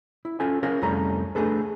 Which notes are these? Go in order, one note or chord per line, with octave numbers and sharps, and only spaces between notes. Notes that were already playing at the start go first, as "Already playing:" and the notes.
E4
C#4 F4 A4 G#5
C#4 G#4 A#4 C#5 F5
C2 F2 G3 A3 C#4 A#5
A3 D4 G#4 A4 B4